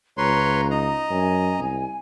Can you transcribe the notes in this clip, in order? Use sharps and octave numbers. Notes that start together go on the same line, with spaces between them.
C#2 B4 C#5 A#5 C6
D#4 D#5 A#5
F#2 G#5
C2